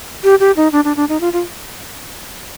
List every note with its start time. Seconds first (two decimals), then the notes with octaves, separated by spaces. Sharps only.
0.24 G4
0.40 G4
0.57 D#4
0.72 D4
0.85 D4
0.97 D4
1.09 D#4
1.21 F4
1.33 F4